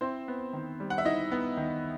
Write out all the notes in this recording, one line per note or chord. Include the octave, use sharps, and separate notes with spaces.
C4 E4 C5
B3
D#3
G3
F#5
E5
D#4 E4 D#5
B3
D#3